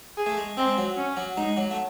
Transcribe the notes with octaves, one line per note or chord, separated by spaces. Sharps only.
G#4
A3
G#3
G#3 C4
F#3
C#4
F#3
G#3 D#4
F#3
A3